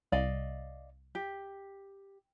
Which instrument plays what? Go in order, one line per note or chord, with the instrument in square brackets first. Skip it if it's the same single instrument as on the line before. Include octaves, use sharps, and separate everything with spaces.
[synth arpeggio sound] C2 [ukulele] D5 D#5 F5
[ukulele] G4